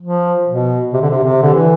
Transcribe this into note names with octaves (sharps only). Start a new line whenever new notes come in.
F3
B2
C3
D3
C3
C3
D3
E3